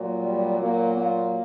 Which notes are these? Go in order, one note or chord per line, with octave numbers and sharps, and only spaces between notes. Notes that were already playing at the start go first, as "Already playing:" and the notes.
Already playing: A#2 F#3
G3
A#2 F#3 A#3
A#3